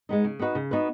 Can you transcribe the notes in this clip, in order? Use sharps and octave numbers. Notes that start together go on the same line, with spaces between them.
G#3 B3 D#4
C#3
B3 D#4 F#4 B4
C#3
B3 D#4 F#4 B4